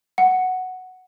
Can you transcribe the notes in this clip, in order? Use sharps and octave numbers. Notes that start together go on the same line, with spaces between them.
F#5